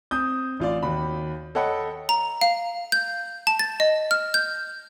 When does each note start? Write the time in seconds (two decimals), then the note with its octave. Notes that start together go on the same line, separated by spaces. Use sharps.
0.11 C4 D#6 G6
0.60 A1 F4 D5
0.83 D#2 F#4 B5
1.55 A4 C#5 D#5 F#5 G5 B5
2.09 A#5
2.41 F5
2.92 G6
3.47 A5
3.59 A6
3.80 D#5
4.11 F6
4.34 G6